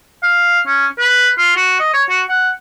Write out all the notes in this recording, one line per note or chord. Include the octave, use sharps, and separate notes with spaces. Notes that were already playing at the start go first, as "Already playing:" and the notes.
F5
C#4
B4
F4
F#4
D#5
C#5
F#4
F#5